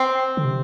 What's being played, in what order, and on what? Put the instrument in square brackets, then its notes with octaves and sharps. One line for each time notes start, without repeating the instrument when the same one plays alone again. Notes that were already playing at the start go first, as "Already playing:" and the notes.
Already playing: [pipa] C4
[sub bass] D3
C3